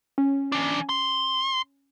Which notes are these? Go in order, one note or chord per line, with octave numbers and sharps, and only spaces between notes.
C#4
E3 D4
C6